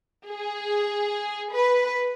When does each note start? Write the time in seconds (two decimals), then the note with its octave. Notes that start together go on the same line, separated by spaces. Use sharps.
0.28 G#4
1.53 B4